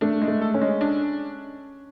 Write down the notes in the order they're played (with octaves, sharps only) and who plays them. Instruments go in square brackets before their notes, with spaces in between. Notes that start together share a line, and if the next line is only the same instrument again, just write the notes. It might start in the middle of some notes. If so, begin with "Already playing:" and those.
[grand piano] A3 [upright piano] D4
[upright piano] G#3
[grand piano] A3
[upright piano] A4
[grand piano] C#4
[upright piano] G#3
D4